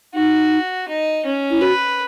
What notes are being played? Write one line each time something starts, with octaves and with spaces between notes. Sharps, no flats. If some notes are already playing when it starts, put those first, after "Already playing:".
D#4 F#4
D#4
C#4
E4
F#4 B4